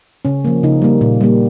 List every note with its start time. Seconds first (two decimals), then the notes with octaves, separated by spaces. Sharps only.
0.25 C#3 C#4
0.45 F3 A#3
0.63 C#3 D#4
0.82 G3 A#3
1.01 A#2
1.21 G3 A#3